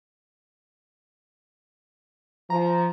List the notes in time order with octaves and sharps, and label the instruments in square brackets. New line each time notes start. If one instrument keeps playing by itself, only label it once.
[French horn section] F3 [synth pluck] A#5